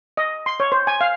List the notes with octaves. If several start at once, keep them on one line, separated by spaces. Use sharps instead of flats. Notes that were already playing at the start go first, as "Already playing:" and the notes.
D#5
C6
C#5
C5
G#5
F5